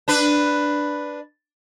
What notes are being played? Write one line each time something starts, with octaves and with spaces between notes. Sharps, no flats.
D4 B4